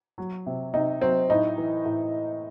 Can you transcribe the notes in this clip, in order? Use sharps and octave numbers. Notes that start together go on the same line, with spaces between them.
F#3
C3
C3 D#4
F#3 C4
A2 D#4
E3
A2